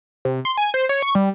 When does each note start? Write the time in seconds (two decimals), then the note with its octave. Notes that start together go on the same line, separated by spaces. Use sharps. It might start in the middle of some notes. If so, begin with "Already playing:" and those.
0.25 C3
0.45 C6
0.58 G#5
0.74 C5
0.89 C#5
1.02 C#6
1.15 G3